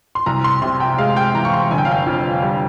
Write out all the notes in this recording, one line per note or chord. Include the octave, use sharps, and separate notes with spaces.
C6
C2 A#5
C6
C3 C6
G5
G#3 F5
G5
E3 A#5
C#6
C6
G1 G#5
G5
F5
G5
F2
G3